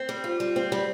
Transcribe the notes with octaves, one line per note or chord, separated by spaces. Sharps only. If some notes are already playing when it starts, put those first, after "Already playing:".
Already playing: C4
G3
F4
G3
C4
G3